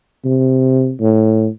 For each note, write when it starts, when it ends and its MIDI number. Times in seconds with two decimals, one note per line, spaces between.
0.25 0.93 48
1.01 1.48 45